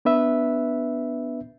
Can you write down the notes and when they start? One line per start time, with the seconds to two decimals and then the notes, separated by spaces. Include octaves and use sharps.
0.05 B3 D4 B4 E5